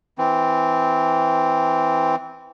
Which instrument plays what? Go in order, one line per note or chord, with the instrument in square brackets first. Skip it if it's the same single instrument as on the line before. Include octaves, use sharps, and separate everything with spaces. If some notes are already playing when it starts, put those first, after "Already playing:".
[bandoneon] E3 C4